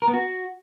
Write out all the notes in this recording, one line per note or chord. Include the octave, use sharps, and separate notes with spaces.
A#4
B3
F#4